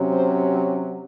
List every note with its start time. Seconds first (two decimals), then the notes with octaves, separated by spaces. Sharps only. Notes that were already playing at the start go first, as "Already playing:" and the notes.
Already playing: C3 F#3 C#4
0.14 C5